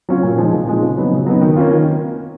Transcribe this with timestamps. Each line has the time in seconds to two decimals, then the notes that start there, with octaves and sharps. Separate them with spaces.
0.09 F#3 C#4 F4
0.23 A#2
0.38 F3 G#3 D#4
0.53 A#2
0.67 F3 G#3 D#4
0.82 C#3
0.97 F#3 B3 D#4
1.12 C#3
1.26 F#3 B3 D#4
1.41 D#3
1.56 A#3 C#4 F4
1.71 D#3